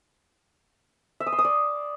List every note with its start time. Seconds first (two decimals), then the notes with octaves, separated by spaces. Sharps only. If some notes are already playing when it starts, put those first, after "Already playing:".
1.20 E5
1.26 D#6
1.33 C6
1.39 D#6
1.45 D5